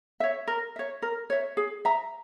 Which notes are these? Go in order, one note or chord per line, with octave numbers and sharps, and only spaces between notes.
C#5 E5
A#4
C#5 E5
A#4
C#5 E5
G#4
E5 A#5